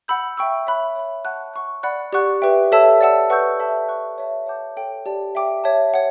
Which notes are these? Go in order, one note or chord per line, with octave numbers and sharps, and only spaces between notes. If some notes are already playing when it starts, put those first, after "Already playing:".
F#5 B5 E6 G6
E5 G5 C#6 E6
C#5 E5 G5 B5 F#6
C#5 E5 B5
F#5 A5 C#6 F#6
F#5 C#6 F#6
D5 F#5 B5 F#6
G4 D5 F#5 C#6 F#6
G4 B4 E5 G5
A4 C#5 E5 A5 E6
D5 F#5 A5 E6
B4 F#5 C#6 E6 G6
A4 E5 A5
F#5 C#6 F#6
C#5 E5 A5
C#5 F#5 A5 D6 G6
A4 C#5 G5
G4 D5 A5
E5 G5 D6
C#5 E5 A5
C#5 F#5